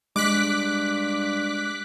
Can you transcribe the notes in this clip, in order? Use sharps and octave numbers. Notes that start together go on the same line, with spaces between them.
G2 G#3 D6 F#6 B6